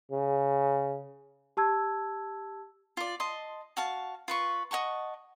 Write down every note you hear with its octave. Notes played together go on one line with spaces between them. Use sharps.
C#3
G4 A5 E6 G#6
F4 D5
D#5 A5 C6
F#4 F5 A5
F4 B4 C#6
D#5 F#5 A5 C#6